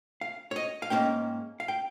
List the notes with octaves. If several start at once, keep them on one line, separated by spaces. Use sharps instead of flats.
F5
C#5
D#5
F5
G#2 D#3 A#3 C#4 G5
F5
G5